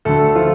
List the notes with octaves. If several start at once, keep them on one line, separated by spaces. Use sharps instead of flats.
D2 D3 A3 A4
F3 F4